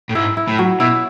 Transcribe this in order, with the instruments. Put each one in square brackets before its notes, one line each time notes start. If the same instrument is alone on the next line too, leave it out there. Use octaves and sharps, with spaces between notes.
[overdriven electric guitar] A2
[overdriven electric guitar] G#2 [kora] E4
[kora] E4
[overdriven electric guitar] A2
[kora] F#3
[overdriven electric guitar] B2 [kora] E4